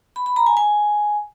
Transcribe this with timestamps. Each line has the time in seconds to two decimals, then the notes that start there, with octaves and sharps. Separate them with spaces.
0.16 B5
0.26 B5
0.36 A#5
0.47 G#5
0.57 G#5